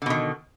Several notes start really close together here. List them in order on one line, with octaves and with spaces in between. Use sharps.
D3 B2 D#3